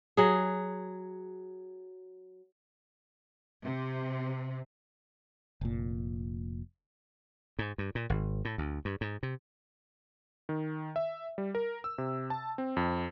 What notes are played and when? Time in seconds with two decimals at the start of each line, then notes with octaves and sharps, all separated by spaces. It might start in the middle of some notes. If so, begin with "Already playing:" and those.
0.17 F#3 G#4
3.63 C3
5.61 F1 A#2
7.59 G#2
7.78 G2
7.95 A#2
8.10 G#1
8.45 A2
8.58 D2
8.85 G2
9.01 G#2
9.23 C3
10.49 D#3
10.96 E5
11.38 G3
11.55 A#4
11.84 E6
11.98 C3
12.30 A5
12.58 C4
12.77 F2